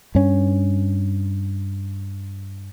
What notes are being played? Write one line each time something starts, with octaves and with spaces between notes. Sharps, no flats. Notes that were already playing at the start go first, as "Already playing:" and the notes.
G2 C#4